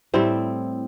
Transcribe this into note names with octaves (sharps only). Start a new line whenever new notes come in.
A2 G3 C4 E4